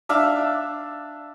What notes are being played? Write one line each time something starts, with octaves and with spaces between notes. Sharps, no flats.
D4 E5 F5